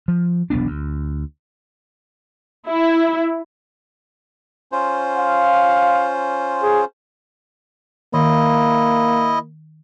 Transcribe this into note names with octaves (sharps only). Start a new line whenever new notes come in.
F3
E1 B1 B3 D4
D2
E4
C#4 F4 C5
F5
G#4
D#3 A#3 E4 D#5